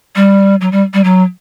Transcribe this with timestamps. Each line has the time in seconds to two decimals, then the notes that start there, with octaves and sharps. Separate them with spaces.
0.16 G3
0.61 F#3
0.72 G3
0.94 G3
1.04 F#3